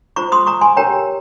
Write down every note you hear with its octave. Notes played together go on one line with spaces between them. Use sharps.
F4 C5 A#5 C#6
C6 D#6
A#5 C#6
G#5 C6
G4 A#4 C#5 G5 A#5